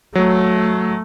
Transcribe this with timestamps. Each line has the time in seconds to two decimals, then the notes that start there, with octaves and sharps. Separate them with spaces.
0.15 F#3 A3